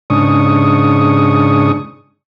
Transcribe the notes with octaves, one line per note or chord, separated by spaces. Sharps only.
G#2 C#3 D4 C#6 D#6